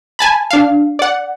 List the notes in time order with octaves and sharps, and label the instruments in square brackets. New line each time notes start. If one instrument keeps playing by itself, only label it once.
[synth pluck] G#5 A5 B5
D4 F5
D5 F#5